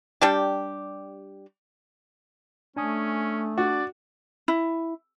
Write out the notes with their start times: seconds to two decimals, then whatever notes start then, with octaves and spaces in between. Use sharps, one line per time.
0.21 G3 D4 G4
2.77 A3 C#4 D4 G#5 D#6
3.58 D4 F#4 D5
4.48 E4